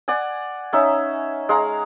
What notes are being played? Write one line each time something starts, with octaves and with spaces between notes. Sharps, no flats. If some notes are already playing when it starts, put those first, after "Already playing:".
D5 F#5 G#5
C#4 D#4 E5
G#3 F5 A#5